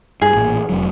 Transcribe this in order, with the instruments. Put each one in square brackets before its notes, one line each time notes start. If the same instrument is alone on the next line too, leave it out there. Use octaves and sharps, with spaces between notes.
[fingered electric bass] G2 [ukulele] G#4
[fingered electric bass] A1 A#2
F1 F#3